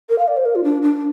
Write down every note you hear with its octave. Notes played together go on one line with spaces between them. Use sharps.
A#4
F5
D5
C5
A#4
F4
D4
D4